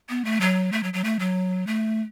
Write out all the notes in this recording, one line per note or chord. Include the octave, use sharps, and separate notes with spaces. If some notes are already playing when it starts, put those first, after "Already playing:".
B3
A3
F#3
A3
F#3
F#3
A3
F#3
A3